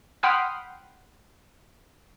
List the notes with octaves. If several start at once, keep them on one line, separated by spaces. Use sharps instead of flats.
F#5 G5 B5 C6 D#6 F6